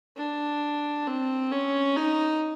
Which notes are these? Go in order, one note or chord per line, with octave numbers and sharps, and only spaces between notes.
D4
C4
C#4
D#4